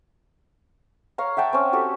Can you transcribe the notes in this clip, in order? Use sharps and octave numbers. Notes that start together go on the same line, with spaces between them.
C#5 F5 A#5
E5 F#5 G5 A5
C4 C#4
F#4 G4 A4